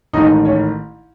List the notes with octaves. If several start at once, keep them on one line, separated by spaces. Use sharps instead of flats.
A1 G#2 D#3 D#4 D#5
C#4 C#5